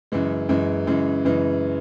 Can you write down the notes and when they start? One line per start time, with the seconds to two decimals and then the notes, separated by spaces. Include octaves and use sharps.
0.12 F#2 C#3 E3 G#3
0.49 F#2 C#3 E3 G#3
0.87 F#2 C#3 E3 G#3
1.25 F#2 C#3 E3 G#3